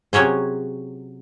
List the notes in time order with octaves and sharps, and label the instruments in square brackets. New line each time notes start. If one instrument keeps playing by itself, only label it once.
[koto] C3 F#3 C#4 G#4 C5